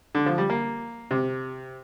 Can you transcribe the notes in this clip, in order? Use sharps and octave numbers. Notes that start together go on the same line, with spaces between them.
D3
F3
G3
A#3
C3